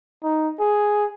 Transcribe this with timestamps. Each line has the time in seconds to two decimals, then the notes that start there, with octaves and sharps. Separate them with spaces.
0.23 D#4
0.60 G#4